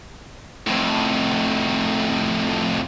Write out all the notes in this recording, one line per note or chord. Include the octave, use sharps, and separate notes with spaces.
F2 A2